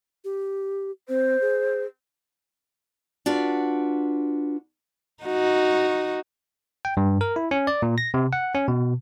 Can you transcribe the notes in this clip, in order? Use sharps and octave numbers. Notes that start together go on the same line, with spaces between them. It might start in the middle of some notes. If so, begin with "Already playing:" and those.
G4
C4 C5
G#4
D4 F4 F#4 B4
D#4 F#4
G5
G2
A#4
E4
C#4
D5
A#2
A#6
C3
F#5
C#4
B2